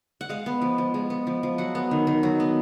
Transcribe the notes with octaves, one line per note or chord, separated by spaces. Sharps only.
F#5
G#3 F5
B3
F3
F3
G#3
B3
F3
F3
F#3 F#5
B3
D#3
D#3
F#3
B3